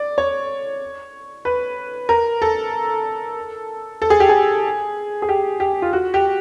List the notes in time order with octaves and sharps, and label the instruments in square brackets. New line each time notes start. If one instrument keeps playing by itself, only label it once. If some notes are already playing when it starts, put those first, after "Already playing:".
Already playing: [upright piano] D5
C#5
B4
A#4
A4
A4
G#4
G4
G#4
G#4
G4
G4
F4
F#4
G4